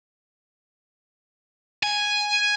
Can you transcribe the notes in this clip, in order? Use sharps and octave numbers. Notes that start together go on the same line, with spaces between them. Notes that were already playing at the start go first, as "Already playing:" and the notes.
G#5